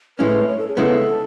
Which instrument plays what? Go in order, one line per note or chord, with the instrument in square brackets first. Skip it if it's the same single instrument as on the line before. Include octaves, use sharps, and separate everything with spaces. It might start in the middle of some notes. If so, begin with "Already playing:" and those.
[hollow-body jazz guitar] A2 G#3 C#4 E4 [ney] B4
[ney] C#5
A4
G#4
[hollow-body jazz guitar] C#3 G#3 B3 E4 [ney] A4